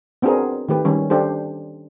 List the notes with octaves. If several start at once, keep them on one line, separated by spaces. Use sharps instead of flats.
B3 C4 D4 F#4 G#4 A#4
D#3 A3 G4 B4
D#3 G3 C#4
D4 G4 A4 C5